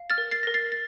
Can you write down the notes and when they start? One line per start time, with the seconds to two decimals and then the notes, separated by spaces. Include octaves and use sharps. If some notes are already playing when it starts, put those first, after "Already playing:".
Already playing: F5
0.10 F6 A6
0.18 A#4
0.31 A6 C7
0.43 A#4 A#6
0.54 A6 C7
0.72 A6